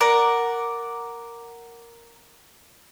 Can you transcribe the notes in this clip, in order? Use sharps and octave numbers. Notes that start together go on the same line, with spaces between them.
A#4 D5 F#5